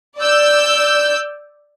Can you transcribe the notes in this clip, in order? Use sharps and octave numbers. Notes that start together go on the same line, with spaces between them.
D5 E6 G6